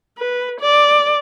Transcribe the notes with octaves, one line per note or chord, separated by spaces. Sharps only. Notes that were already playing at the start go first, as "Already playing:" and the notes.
B4
D5